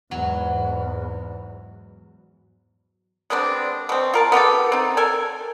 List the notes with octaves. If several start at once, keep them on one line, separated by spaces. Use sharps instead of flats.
E2 G#2 F#3
G#3 B3 C4 D4
B2 C4
F4 A#4 A5
B3 F4 G4 A4
C4 D#4
A4 A#4 G#5